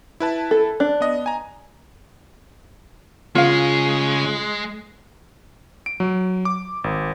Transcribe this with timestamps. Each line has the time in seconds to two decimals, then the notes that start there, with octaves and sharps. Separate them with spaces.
0.20 E4 B4 A5
0.51 A4
0.80 D4 F#6
1.01 B3 D#5
1.26 G#5 A#5
3.35 C#3 G#3 F4 F5
5.86 D7
6.00 F#3
6.45 D6
6.84 G#1